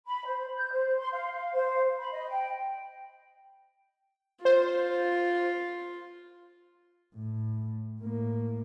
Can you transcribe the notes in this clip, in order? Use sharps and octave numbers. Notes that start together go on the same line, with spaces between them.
B5
C5
G6
C5
C6
F5
F5
C5
B5
D#5
G5
F4 C5
A2
A2 A#3